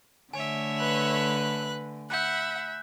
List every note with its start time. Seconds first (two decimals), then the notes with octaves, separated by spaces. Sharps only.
0.34 D3 A3 C#5 E5 G#5
0.79 B4 F#6
2.10 E5 F#5 B5 F#6 G6